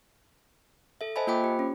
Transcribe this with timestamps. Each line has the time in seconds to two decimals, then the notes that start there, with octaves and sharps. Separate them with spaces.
1.01 A4 E5
1.16 C5 D#5 E5 G#5 A5 B5
1.27 A#3 F4 C5 G5 B5 D6
1.44 G4
1.59 C#4